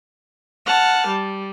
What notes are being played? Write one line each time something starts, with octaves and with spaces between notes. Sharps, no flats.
F#5 A5 F6
G3